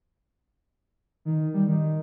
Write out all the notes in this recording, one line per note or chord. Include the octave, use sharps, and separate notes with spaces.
D#3
G3
D#3